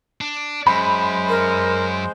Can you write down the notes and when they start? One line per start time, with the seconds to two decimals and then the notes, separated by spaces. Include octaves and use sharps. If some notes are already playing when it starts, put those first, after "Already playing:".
0.21 D4
0.67 F#2 G#3 C5 B5
1.29 A#4